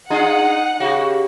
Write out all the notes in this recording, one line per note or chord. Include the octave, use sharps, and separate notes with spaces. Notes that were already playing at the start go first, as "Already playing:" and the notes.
D4 D#4 F4 G#4 F#5
C#3 F#4 G4